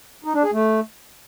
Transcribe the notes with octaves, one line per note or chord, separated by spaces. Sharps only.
D#4
D4
G#4
A3